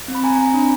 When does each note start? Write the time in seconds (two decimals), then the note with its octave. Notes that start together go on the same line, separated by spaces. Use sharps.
0.08 C4
0.15 B5
0.23 C4 G#5 A#5
0.38 C4
0.54 D4